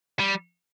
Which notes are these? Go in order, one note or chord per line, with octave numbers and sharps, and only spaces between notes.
G3